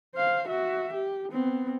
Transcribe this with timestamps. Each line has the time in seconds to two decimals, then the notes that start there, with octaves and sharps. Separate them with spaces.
0.15 C5 F5
0.48 F#4 E5
0.93 G4
1.32 B3 C4